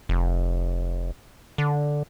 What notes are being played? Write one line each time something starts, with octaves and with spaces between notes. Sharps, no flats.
F1
D3